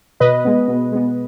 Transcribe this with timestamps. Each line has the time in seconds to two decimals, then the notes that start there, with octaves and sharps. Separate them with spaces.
0.20 B2 B4 D#5
0.45 G#3 B3
0.68 B2
0.92 G#3 B3